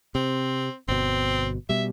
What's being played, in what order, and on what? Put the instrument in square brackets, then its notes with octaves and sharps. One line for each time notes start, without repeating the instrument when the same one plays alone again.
[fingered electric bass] C3 [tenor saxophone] C4
[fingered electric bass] G1 B2 [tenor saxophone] C4
[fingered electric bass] B2 G3 [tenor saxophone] E5